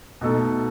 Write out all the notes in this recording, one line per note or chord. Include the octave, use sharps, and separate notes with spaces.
B2 A3 D#4 A4